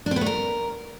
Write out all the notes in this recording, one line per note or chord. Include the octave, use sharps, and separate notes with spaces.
D4
C4
B3
A3
A#4